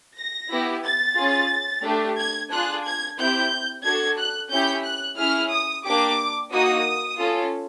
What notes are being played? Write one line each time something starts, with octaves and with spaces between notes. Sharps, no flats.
A#6
B3 E4 G4
A6
C#4 F4 G#4
A3 D4 G4
G#6
D4 F4 G#4 F#6
G#6
C4 E4 G4 G6
D4 F#4 A4 G#6
F#6
C#4 E4 G4 G6
F#6
C#4 E4 G#4 F6
D#6
A#3 D4 G4 D6
A#3 D#4 F#4 D#6
C#4 F4 A4